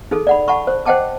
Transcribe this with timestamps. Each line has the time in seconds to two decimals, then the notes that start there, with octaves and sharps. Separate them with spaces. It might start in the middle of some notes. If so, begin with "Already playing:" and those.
0.11 D#4 G#4 A4
0.27 D5 F#5 B5
0.48 F#5 A5 B5 C#6
0.67 C5
0.85 C5 D#5 F#5 G5 A5 D6